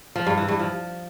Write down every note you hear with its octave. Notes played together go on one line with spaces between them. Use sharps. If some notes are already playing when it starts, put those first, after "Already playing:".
F3
G2
E3
G2
F3